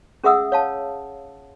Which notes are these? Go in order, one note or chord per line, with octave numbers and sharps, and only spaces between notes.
C#4 G#4 E5 F#5 D#6 E6
C#5 F5 A5